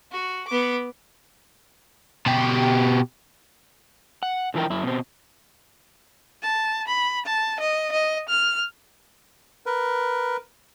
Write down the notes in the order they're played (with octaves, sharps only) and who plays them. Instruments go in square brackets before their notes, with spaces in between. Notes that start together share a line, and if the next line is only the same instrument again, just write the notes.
[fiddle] F#4
B3 D6
[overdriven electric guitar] B2 G4
[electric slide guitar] F#5
D3 E3 F3 E4 A#4 G5
F#2 E4
B2 C4
[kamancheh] A5
B5
A5
D#5
D#5
F6
[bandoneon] A#4 B4